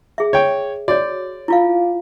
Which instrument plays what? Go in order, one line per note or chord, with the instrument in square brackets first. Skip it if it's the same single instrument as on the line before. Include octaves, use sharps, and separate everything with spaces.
[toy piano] G#4 E5
[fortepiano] C#5 G5
[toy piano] F#4 C#5 [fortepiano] D5
[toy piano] E4 F4 F5